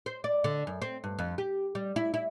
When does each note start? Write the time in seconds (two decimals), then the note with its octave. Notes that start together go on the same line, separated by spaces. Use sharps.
0.06 C5
0.24 D5
0.44 D3
0.67 F#2
0.82 C4
1.04 G2
1.19 F2
1.38 G4
1.75 G3
1.96 E4
2.14 E4